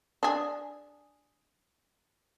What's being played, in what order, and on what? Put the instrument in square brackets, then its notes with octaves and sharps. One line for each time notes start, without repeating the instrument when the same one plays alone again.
[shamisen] D4 G#4